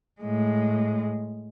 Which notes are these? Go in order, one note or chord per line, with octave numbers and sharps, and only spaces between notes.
A2 G#3